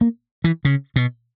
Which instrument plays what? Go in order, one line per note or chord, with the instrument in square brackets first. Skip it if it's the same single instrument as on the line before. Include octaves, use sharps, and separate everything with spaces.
[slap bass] A#3
E3
C#3
B2